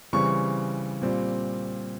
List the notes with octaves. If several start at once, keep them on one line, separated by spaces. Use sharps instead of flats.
C#3 E3 G3 C4 C#6
A#2 G3 C4